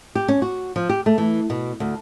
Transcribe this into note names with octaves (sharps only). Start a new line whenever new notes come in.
G4
C#4
F#4
F3
G4
A3
E3
B2
D2